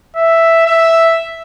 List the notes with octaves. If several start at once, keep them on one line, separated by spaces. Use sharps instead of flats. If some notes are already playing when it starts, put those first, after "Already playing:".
E5
E5